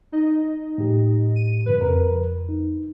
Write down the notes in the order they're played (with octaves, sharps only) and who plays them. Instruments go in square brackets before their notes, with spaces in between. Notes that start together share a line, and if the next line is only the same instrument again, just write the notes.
[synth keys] D#4 D#5
[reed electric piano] A2 G4
[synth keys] D#7
[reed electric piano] G2 C#3 [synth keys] B4
[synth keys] F2 [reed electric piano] A#4 B4
[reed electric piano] D#4